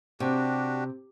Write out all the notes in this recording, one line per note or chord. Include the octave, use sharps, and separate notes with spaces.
C3 D4 F#4 G4